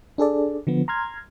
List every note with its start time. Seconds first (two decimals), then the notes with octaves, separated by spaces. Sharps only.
0.18 D4 G#4 A4 D5
0.67 D3 F3 B3
0.88 A#5 C6 F6 G#6